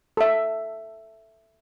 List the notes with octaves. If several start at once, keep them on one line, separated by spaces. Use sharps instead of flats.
A4 E5